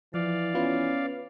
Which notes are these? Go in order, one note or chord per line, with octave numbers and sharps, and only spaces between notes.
E3 F3 D5 F5
B3 C#4 F4 B4